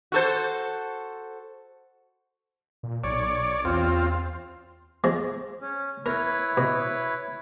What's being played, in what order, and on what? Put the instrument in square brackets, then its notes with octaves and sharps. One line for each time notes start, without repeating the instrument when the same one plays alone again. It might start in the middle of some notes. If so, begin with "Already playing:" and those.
[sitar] F#4 A4 C5
[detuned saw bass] A#2
[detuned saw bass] B1 [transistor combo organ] C#5 D5
[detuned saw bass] E2 [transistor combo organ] C4 F4
[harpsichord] F3 G#3
[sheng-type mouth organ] C#4
[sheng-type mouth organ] E4 B4 C#5 [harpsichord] A#4
[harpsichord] B2